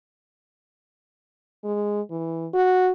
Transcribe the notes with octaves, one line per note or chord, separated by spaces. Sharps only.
G#3
E3
F#4